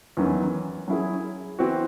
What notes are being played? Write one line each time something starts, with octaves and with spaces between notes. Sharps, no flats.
E2 D#3 F#3 C#4
F#3 C#4 E4 G#4
E3 C4 F#4